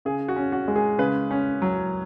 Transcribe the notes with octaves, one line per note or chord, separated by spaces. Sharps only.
C#3 G#4
F#4
C#4
F#4
G#3
G#4
C#3 B4
C#4
F#3